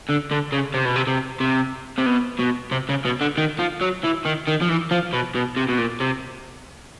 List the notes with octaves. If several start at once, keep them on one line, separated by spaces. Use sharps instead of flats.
D3
D3
C#3
C3
B2
C3
C3
C3
C3
B2
B2
C3
C#3
B2
D3
D#3
F3
F#3
E3
D#3
D#3
F3
E3
F3
B2
B2
C3
B2
A#2
C3